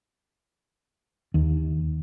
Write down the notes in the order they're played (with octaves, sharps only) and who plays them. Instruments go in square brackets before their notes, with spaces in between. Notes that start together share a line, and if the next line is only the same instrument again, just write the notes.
[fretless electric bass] D#2